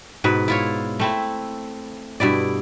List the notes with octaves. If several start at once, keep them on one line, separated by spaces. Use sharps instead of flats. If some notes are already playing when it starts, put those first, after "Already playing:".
G#2 B2 B4
E4 F4 C#5
A3 C4 E4
G2 B2 E4 D5